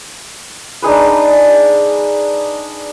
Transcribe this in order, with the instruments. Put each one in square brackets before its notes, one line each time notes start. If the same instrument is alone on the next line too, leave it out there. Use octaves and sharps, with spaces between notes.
[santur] D4 D#4 G#4 B4